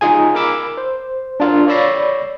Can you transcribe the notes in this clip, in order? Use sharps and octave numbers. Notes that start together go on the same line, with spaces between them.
D#4 F4 G#4 G#5
A#4 B5 D6 E6
C5
D4 F4 A#4
C#5 D5 B5 E6 A#6 C7